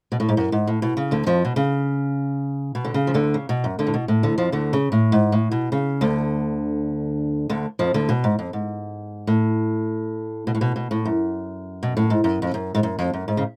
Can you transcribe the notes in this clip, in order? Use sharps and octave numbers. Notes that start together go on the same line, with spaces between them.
B2
A2
G#2
F#2
G#2
A2
B2
C#3
D2 D3
F2 F3
B2
C#3
B2
D3
C#3
F3
D2 D3
C#3
B2
F#2
D2 D3
A2
B2
A2
D2 D3
F2 F3
D2 D3
C#3
A2
G#2
A2
B2
C#3
D2 D3
D2 D3
F2 F3
D2 D3
B2
G#2
F2
G#2
A2
B2
A2
B2
B2
A2
F#2
B2
A2
G#2
F#2
F2
F#2
G#2
F#2
F2
F#2
G#2
C#3